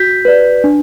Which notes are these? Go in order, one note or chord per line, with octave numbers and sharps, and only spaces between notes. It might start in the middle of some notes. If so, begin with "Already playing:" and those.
Already playing: F#4 G6 B6
B4 D5
D4